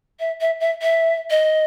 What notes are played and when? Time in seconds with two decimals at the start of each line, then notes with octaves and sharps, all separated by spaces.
0.20 E5
0.41 E5
0.60 E5
0.82 E5
1.30 D#5